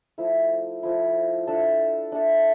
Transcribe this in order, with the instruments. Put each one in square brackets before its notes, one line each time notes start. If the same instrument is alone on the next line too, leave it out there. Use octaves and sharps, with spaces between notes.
[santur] F3 A3 E4
F3 A3 E4
D4 A4 E5
D4 A4 E5